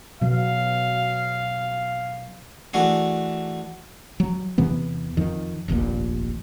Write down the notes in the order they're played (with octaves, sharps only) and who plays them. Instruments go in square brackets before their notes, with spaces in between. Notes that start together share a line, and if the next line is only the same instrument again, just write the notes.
[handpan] B2 F#3 B3 [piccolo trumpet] F5
[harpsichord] E3 A3 D4 F#4 G#4
[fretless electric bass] F#3
E2 C3 E3 B3
F2 D#3
F1 A#1 D#2 A#2